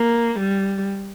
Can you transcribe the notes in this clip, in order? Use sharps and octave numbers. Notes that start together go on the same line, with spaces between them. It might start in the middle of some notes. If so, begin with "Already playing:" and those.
Already playing: A#3
G3